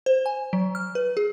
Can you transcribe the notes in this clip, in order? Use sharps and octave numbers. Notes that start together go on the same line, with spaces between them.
C5
G#5
F#3
F6
B4
G#4